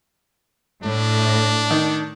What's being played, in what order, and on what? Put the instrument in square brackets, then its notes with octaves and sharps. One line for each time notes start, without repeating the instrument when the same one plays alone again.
[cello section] A2 [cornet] D4
[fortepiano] D#3